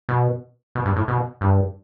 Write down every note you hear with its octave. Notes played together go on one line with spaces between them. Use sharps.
B2
B2
G2
A2
B2
G2